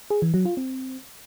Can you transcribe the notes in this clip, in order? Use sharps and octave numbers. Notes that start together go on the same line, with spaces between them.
G#4
E3
F#3
F4
C4